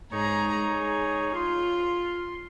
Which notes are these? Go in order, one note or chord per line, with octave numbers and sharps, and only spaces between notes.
G#2 D#4 G#4 C#5 A#5
G#4
F4 C6